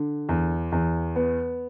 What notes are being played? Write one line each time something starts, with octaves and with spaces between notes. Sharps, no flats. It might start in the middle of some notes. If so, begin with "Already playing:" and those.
Already playing: D3
E2
E2
B3